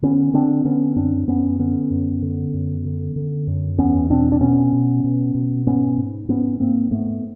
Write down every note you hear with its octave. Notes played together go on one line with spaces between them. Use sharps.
D3 B3 C#4
D3 C4 D4
D3 B3 C#4
F#2 C4 D4
F#2 B3 C#4
D3 B3 C#4
F#2
D3
F#2
D3
D3
F#2
E2 B3 C#4
B2 C4 D4
D4
B2 B3 C#4
B2
B2
B2
G#2 B3 C#4
G#2
G#2 B3 C#4
G#2 A#3 C4
G#2 A3 B3